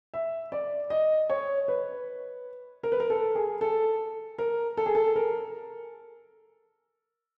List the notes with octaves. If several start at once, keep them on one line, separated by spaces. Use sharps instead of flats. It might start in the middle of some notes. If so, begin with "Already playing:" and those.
E5
D5
D#5
C#5
B4
A#4
B4
A#4
A4
G#4
A4
A#4
A4
G#4
A4
A#4